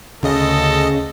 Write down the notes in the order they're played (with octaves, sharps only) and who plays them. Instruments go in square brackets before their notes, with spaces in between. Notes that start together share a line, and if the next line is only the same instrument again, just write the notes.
[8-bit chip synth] D2 D#5 [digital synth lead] C#3 [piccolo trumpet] A4